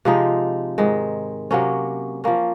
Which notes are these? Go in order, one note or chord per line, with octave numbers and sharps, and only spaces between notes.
C3 F3 G#3 D#4
G#2 D#3 G#3
C3 F#3 A#3 C#4
F3 A#3 C#4